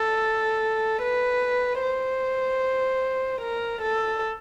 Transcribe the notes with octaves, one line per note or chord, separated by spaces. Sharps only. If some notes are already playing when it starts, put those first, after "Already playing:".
Already playing: A4
B4
C5
A#4
A4